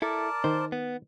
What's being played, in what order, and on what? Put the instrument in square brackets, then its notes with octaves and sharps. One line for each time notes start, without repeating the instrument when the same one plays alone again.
[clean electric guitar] E4 A4 [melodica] A#4 D5 A5
[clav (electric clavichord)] D#3 [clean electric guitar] C5
[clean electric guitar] B3